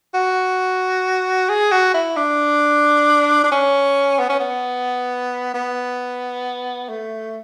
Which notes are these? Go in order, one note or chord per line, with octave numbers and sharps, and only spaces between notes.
F#4
G#4
F#4
E4
D4
D4
C#4
B3
C#4
B3
B3
A3